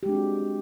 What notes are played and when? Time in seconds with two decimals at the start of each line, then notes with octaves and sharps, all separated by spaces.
0.03 G4
0.06 G#3
0.09 D4
0.12 C4
0.15 F#4